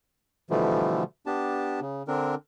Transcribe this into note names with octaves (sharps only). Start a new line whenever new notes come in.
B2 D3 E3 F3 G3 A3
B3 D4 G4 A5
C#3
D3 C4 D4 A#4